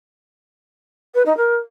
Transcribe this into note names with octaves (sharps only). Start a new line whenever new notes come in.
B4
D#4
A#4